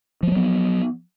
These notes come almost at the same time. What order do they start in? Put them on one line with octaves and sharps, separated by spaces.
F3 A#3 F#3 B3